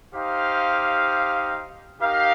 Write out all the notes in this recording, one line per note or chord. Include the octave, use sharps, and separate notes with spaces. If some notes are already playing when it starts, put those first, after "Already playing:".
D#4 G4 C5 F5
D#4 G4 A#4 F5